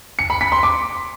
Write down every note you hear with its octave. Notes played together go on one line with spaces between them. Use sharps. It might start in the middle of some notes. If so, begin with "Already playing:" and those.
C#7
B5
B6
C6
D6